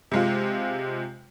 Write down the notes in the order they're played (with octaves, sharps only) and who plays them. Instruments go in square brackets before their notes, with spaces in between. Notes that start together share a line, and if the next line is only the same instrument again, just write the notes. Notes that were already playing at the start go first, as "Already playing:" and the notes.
[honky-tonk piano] C3 G#3 F4